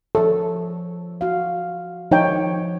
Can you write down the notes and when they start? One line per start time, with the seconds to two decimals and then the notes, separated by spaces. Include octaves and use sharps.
0.15 F3 A4 C#5
1.21 F#4 F5
2.11 F3 D#4 C#5 G5